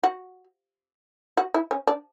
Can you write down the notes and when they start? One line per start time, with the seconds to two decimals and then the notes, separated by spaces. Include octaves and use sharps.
0.04 F#4
1.37 F#4
1.54 E4
1.71 C#4
1.87 D4